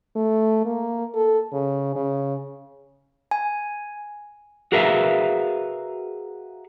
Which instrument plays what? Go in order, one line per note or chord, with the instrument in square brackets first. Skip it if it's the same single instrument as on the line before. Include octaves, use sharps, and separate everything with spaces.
[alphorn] A3
A#3
A4
C#3
C#3
[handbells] G#5
[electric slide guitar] F#4 G#4 A#4 B4 E5 F5